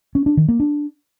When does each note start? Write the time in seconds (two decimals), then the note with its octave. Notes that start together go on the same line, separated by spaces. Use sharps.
0.15 C#4
0.26 D4
0.37 D#3
0.48 A#3
0.60 D4